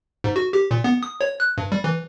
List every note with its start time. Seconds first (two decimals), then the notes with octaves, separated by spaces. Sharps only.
0.24 G#2
0.36 F#4
0.53 G4
0.71 A#2
0.84 B3
1.03 D#6
1.21 C#5
1.40 F#6
1.58 G2
1.72 G3
1.84 E3